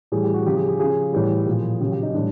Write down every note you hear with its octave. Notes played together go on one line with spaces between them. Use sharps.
A2 E3 G3 G#4
G4
F#4
C#3 F3 G4
G#4
G#4
C#3 F3 G#4
A2 E3 G3
A#2 F3
C#3 F#3 G4
G4
D#4
A2 E3 G3 D4